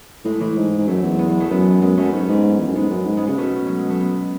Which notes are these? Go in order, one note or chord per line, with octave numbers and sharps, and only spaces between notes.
A2 G#3
A3
A2 E3 G#3
G#2
G#2
F#2 F#3 A3
E2
G#3 B3
G#3 B3
F#3 A3
F#2 G#3 B3
F#2 G#3 B3
F#2 A3 C#4
B3
G#2 A3 C#4
F#2
G#2
E2
F#2
G#2 G#3 B3
F#2
G#2
G#3 B3
C#3 G#3 B3
B2 A3 C#4
F#3
G#3
A3
G#3 B3